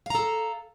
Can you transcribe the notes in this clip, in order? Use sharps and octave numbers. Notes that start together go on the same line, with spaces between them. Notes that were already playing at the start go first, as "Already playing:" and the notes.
A4 F5 A#5